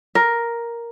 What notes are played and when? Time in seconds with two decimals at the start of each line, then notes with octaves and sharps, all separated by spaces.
0.15 A#4